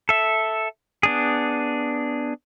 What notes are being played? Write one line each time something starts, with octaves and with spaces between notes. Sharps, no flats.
A4 E5
B3 D4 G#4